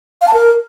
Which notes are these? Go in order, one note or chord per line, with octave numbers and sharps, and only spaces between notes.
F5
A5
A#4